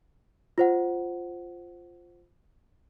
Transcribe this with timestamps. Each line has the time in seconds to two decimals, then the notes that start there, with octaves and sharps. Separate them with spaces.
0.58 F4 C5 F#5